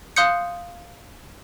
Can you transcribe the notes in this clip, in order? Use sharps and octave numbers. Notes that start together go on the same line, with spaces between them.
F5 C6 D#6 F#6 G6 C#7